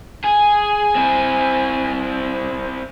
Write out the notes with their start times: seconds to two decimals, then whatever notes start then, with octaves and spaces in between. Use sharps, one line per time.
0.24 G#4 G#5
0.95 C4 E4